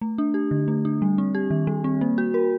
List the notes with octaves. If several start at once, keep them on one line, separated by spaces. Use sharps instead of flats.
A3
D4
G4
D3
A3
D4
G3
C4
G4
D#3
G3
C4
A#3
F#4
A#4